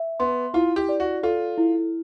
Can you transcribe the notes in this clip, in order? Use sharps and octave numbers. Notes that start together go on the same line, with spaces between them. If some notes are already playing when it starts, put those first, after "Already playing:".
Already playing: E5
B3 C6
E4 F4
G4
D5
F#4
F4 A4
E4